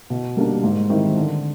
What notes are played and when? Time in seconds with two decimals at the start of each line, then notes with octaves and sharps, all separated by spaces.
0.10 B2
0.37 G3 A#3 D4
0.63 G#2
0.89 D#3 G3 C4 E4
1.16 D3